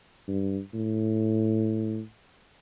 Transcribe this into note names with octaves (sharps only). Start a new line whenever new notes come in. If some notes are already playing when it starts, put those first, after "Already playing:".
G2
A2